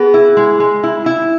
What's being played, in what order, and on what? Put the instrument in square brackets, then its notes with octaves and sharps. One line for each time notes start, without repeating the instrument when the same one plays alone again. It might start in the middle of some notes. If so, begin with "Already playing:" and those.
Already playing: [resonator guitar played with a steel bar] B3 [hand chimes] G#4
[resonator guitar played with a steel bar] E4
G#3
G#3
E4
E4